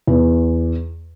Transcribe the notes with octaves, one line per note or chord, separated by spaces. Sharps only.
E2